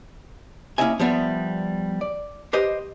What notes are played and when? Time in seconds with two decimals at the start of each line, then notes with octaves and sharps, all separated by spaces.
0.78 A#3 C#4 E4 D#5 E5 G#5
0.99 F3 G3 B3 E5
2.01 D5
2.53 G4 B4 C5 D#5